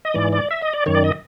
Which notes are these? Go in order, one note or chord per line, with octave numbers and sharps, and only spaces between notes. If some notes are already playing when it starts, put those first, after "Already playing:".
D#5
G#2 E3 D5
D5
E5
D#5
D5
F#2 D#3 C#5
D5
D#5